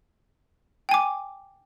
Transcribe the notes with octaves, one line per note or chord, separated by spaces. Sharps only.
G5 G#5 D6